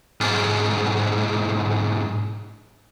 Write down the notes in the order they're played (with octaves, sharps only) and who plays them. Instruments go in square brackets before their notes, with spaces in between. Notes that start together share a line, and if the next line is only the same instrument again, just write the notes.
[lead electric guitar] B1 G#2